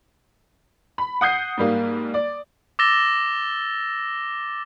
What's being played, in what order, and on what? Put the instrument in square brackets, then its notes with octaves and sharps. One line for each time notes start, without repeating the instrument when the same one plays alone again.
[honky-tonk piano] B5
F#5 D#6 G6 C7
G#2 G3 A#3
D5
[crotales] D6 E6 A6 A#6 E7 G7